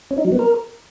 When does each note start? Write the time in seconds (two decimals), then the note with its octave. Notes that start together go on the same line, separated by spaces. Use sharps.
0.11 C#4
0.18 D#4
0.25 F#3
0.32 B3
0.39 A#4